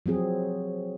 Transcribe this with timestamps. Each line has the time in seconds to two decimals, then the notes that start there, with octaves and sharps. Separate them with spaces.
0.06 F3 F#3 C4 G#4